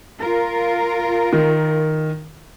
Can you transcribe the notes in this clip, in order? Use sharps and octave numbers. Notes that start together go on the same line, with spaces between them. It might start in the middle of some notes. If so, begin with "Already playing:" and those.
F4 A#4
D#3